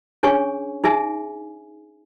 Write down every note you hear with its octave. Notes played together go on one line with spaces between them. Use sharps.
C#4 D4 G#4 C#5 G#5 C#6
D#4 G#4 E5 G#5